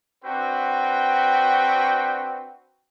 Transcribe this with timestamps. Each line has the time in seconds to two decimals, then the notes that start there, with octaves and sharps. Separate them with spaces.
0.24 C4 D4 F#4 B4 G5